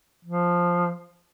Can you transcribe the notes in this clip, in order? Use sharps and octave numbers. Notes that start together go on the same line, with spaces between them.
F3